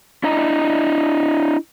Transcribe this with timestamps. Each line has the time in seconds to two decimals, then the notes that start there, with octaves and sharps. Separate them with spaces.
0.24 D4 E4 D#5 A#5